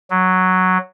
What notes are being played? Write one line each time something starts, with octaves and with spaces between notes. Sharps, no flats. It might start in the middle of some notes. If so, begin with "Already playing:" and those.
F#3